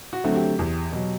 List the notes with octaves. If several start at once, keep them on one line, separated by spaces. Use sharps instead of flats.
F#4
D3 F#3 A3 C4
G4
E2
B2 F#3